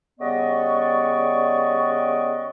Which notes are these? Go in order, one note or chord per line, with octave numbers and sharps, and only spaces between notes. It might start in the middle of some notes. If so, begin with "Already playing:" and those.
C#3 G3 B3 D5 D#5 C#6